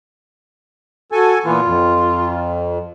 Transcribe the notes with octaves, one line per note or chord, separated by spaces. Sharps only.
F#4 A4 G#5
A#2 E3 B3 F4
F2